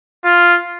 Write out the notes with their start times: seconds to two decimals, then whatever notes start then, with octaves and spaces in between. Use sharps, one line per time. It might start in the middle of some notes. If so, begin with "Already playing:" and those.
0.25 F4